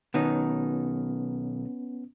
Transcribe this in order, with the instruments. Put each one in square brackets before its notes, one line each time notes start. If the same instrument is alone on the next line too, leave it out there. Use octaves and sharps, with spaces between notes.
[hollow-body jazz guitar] B1 D#3 D#4 [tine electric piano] B3 C#4